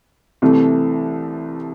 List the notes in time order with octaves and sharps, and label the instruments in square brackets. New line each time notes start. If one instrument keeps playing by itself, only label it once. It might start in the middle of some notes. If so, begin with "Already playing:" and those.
[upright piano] C2 C3 E3 A3